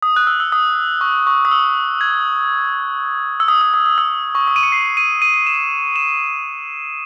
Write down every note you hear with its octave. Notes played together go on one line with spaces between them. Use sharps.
D#6
F#6
E6
E6
D#6
C#6
C#6
D#6
E6
G#6
E6
D#6
D#6
D#6
D#6
E6
C#6
D#6
D#7
C#7
C7
D#7
D#7
D#7
E7
E7